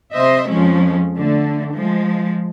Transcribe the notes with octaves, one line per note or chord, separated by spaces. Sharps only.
C3 C5 D#5 E5
F2 F3 G#3 C#4
D3 A3
F3 G#3